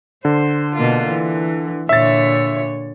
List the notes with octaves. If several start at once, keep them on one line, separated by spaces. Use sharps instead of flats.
D3 C5
B2 A#3 F4
E3
A#2 D3 C#5 E5 A6